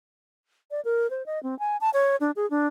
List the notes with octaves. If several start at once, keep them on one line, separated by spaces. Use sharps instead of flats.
D5
A#4
C5
D#5
C4
G#5
A5
C#5
D4
G#4
D4